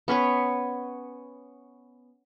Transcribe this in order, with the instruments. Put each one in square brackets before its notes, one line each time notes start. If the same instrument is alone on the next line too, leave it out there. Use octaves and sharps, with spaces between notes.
[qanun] B3 C#4 B4 C#5